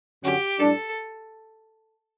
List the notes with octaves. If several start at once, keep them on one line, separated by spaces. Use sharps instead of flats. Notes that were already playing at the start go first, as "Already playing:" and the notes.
F#2 D3 F#3 C#4 F#4 G4
A2 G3 D4 A4